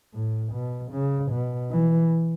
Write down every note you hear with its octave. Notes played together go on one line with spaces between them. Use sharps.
A2
B2
C#3
B2
E3